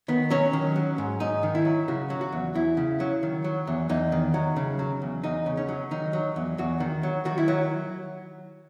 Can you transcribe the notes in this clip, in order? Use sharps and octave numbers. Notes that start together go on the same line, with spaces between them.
D#3 B3
F#3 C#4
D#3
F#3
G#2
G#2 D#4
D#3
E4
F#3
C#3 F#4
F#3
F#4
E2
E2 E4
C#3
F#3
D#3
F#3
E2
E2 D#4
D#3
F#3
C#3
F#3
E2
E2 D#4
C#3
C#4
F#3
D#3 D#4
F#3
E2
E2 F#4
D#3
F#3
D#3 F#4
E4
F#3